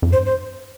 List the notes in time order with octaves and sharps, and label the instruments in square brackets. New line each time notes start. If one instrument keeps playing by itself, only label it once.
[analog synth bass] F2
[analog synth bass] G2 [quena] C5
[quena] C5